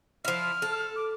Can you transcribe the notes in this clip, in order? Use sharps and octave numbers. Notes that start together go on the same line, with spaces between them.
F3 E4 F6
A4
D6